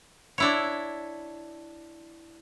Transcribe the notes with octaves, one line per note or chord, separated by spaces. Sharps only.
D4 E4 C#5